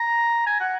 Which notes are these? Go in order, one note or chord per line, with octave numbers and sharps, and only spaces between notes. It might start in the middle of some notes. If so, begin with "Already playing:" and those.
Already playing: A#5
G#5
F#5